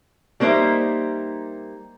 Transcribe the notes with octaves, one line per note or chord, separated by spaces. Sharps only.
G3 A#3 D#4 C5 E5